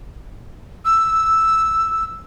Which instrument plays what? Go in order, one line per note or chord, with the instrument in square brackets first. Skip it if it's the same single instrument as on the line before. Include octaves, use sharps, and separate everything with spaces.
[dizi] E6